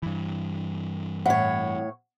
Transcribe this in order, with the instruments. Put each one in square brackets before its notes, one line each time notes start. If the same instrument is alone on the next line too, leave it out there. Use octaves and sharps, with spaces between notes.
[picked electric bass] G2 E3
[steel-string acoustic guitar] A2 C#5 [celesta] F#5